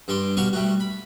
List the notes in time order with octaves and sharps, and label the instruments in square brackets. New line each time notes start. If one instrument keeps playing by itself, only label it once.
[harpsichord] G2 G3 C6 D6
B2 G3 F#4 F5 C#6
G3 A3 F#4
B5